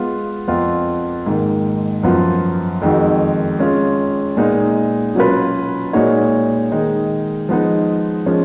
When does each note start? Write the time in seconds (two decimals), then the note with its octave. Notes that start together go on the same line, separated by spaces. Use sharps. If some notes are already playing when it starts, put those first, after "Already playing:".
Already playing: G#3 B3 F4
0.48 F2 F3 B3 F4
1.26 G#2 D#3 A#3
2.03 F#2 F3 B3 F4
2.82 F2 D#3 G#3 D#4 F#4
3.59 G#3 C#4 F4
4.37 A#2 G#3 B3 D#4
5.15 B2 F#3 C#4 F4 B4
5.93 A#2 G#3 D#4 F#4 C#5
6.71 D#3 G#3 D#4
7.49 F3 G#3 B3 D#4
8.26 F3 G#3 C#4